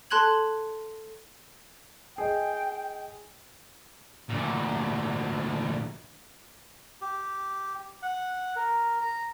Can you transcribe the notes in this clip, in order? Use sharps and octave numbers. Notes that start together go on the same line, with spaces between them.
A4 A5 C6 F#6 G#6 F#7
G#4 D#5 G5
D2 A#2
G4
F#5
A#4
A#5